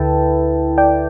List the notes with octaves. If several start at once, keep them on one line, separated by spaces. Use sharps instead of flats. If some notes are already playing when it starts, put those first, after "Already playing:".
Already playing: D2 D3 E4 A4 B4 E5 G5 A5
D5 G5